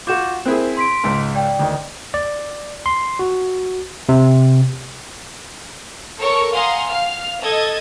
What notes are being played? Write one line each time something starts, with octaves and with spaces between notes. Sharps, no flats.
F4 F#4 D6 G6 E7
C4 E4 G#4 A#4 C5
C6 B6 D7
C#2 G#2
D5 G5
D2 D#3
D5
C6
F#4
C3
A4 A#4 C#5 C#6
F5 F#5 G#5 A#5 C6 D#6
F5 F6
A4 D#5 G#6 A6